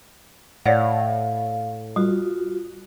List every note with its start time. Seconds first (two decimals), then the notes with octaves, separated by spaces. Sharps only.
0.66 A2 C#5 D5 F5 F#5
1.96 G3 F4 F#4